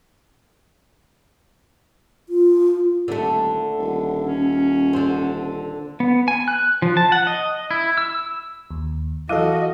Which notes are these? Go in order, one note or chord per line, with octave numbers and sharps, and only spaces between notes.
F4
D#1 D3 A3
D#1
C#4
D3 C4
B3
G#5
F#6
F3
A5
F#5
D#5
E4
E6
D#2
E3 F#3 E4 F#4 A4 D#5 F5